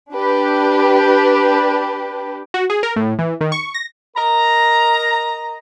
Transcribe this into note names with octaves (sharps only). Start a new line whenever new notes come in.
D4 G4 B4
F#4
G#4
A#4
A2
E3
D#3
C#6
A#6
A#4 D#5 A#5